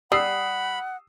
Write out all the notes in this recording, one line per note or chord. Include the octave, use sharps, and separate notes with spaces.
G3 F#5 B5 D#6 E6 C7